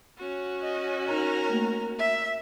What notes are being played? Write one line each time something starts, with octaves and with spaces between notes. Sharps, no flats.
C#4 F#4
D#5
D#4 A#4 A#5
A3 A#3
E5